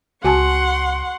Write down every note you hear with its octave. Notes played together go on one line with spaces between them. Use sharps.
C#2 F#4 F#5 G#5 A5 C6 C#6